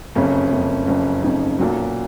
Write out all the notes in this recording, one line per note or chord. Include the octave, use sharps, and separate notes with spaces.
F#1 F2 C#3 C#4
F#1 F2 C#3
F#1 F2 C#3
F#1 F2 C#3 D#4
B1 A#2 F#3